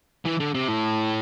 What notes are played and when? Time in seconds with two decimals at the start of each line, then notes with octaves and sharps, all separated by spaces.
0.25 E3
0.40 D3
0.54 C3
0.68 A2